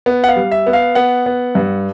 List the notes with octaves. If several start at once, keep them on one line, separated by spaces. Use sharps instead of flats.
B3
F#5
F5
G3
E5
B3
F5
B3 F#5
B3
G2